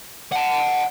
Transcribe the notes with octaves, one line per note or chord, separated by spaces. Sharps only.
F#5 A5